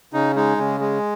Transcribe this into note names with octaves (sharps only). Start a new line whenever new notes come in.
C#3 D#4
G#3 D#4
C#3
G#3